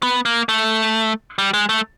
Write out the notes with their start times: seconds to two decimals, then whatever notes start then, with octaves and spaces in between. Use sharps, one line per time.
0.03 B3
0.25 A#3
0.49 A3
1.38 G3
1.54 G#3
1.69 A3